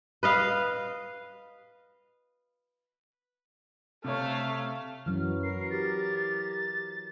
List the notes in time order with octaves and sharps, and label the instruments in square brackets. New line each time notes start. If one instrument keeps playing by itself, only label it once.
[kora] B4 D#5 F5
[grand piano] C3 C#5 [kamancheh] A3 F5
[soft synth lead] F#2 [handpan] E3 F#3 [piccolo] F6
[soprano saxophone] A#4 [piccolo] C7
[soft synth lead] G4 [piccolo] A6